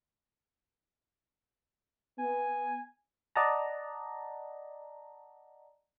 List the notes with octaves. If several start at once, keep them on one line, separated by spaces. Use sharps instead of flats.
B3 G#5
D5 D#5 F#5 A5 A#5